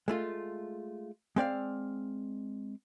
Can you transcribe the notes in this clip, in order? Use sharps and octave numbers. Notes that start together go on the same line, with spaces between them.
G#3 A3 F4
G#3 C4 D5 F5